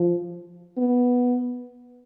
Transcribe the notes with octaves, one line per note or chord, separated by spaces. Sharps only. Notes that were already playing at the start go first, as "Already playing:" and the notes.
Already playing: F3
B3